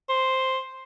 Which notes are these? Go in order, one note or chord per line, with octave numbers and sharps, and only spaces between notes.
C5